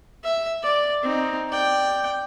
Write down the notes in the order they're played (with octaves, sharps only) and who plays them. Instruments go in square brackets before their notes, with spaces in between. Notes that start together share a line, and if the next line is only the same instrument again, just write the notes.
[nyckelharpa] E5
D5
C4 D#4
D5 G5